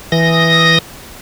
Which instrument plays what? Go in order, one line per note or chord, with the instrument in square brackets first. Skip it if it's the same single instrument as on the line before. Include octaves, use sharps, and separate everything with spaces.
[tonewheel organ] E3 D#6 A#6